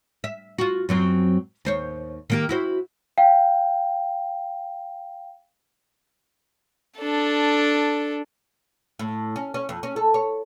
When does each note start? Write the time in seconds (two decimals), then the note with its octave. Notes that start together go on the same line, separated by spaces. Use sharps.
0.24 E5
0.58 F4 F#4
0.89 F#2 F#3 C4
1.65 D#2 C5 C#5
2.30 D#3 A#3 G4
2.49 E4 F#4 C5
3.18 F5 G5
6.99 D4 A4
8.99 A2
9.36 C#4
9.54 C#4
9.69 F2
9.83 C#4
9.96 A4
10.14 C#5